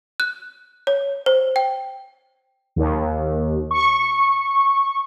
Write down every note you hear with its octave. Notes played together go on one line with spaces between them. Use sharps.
F#6
C#5
C5
G5
D#2
C#6